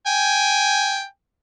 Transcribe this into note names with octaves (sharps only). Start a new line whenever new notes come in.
G5 G#5